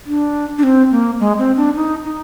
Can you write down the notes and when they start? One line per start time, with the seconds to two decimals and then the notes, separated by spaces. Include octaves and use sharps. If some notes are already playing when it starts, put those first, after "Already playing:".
0.05 D4
0.58 D4
0.63 C4
0.91 A#3
1.20 G#3
1.38 C4
1.57 D4
1.75 D#4
2.04 D#4